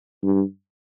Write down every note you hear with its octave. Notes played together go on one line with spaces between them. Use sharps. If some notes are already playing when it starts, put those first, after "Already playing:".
G2